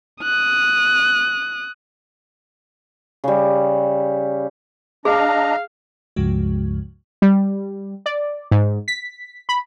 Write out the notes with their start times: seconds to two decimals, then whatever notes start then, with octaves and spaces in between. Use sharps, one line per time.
0.23 D#6 F#6
3.24 C#3 G3
5.05 D4 G#4 D#5 F5 A#5
6.16 C#2 G2 C#3 F3 G#3 F#4
7.22 G3
8.06 D5
8.51 G#2
8.88 B6
9.49 B5